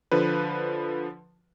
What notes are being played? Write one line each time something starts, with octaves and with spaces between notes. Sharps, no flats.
D3 F3 B4